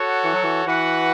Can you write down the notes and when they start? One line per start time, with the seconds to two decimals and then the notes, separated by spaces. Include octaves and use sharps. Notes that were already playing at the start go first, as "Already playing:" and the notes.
Already playing: F#4 A4 C#5 F#5
0.24 E3
0.33 F#3
0.43 E3
0.66 E3 F#4 B4 F#5